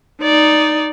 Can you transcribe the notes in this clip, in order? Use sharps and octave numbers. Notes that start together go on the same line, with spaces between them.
D#4 D5